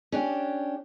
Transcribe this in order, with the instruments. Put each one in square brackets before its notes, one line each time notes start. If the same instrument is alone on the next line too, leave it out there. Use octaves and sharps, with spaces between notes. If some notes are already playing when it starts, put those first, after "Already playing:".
[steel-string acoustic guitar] C#4 D4 G4